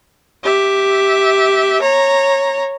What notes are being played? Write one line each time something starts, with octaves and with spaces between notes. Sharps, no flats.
G4 E5
C#5 A#5